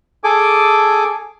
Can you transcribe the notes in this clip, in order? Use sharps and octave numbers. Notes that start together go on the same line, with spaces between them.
G#4 A4 G#5 D6